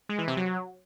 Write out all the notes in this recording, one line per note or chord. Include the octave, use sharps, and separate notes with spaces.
G#3
E3
C3
F#3